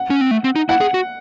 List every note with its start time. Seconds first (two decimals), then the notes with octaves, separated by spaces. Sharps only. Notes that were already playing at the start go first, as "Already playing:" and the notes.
Already playing: F#5
0.10 C#4
0.21 C4
0.31 A3
0.44 C4
0.56 D#4
0.69 E4 F#5
0.81 G#4
0.94 F#4